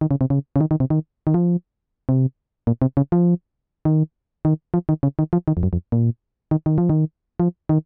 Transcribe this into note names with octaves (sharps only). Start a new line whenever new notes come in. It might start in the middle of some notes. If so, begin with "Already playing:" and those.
D#3
C#3
C3
C#3
C#3
D#3
D#3
C3
D#3
D#3
F3
C3
A#2
C3
C#3
F3
D#3
D#3
F3
D#3
C#3
D#3
F3
D#3
F2
F#2
F2
A#2
D#3
D#3
F3
D#3
F3
D#3